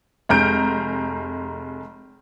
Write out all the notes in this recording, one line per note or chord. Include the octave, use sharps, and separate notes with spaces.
F1 G#3 A#5 F6 G6 D7